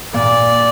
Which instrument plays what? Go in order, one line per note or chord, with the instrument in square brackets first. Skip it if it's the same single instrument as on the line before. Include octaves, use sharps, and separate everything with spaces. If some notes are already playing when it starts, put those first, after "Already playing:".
[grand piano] A#2 [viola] D5